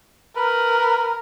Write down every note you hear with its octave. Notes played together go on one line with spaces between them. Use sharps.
A#4 B4